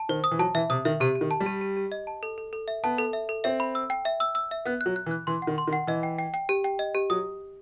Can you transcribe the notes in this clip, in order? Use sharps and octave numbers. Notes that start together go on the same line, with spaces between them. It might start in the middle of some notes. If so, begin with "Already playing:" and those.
Already playing: A5
D#3 C5
D#6
E3
F#3 A5
E3 E5
C3 D#6
D#3 E5
C3 G4
G4
D#3
A5
G3
G4
G4
G4
D#5
A5
A4
A4
A4
E5
B3 A5
A4
E5
A4
C4 E5
B5
E6
G5
E5
E6
E6
E5
B3 F#6
F#6
F#3
F#6
E3
F#6
E3 C6
F#5
D#3
C6
D#3
F#5
E3 D#5
G5
G5
G5
G4
G5
D#5
G4
F#3 D#6